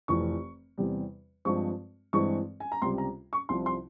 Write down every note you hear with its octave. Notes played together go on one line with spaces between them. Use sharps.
F1 F2 E3 C#6
E2 C3 G3
G2 F3 G#3 C4 C#6
G2 E3 G#3 C4 C#6
G#5
A#5
C#2 C3 G3 C6
A#5
C#6
C2 C3 F3 C6
C6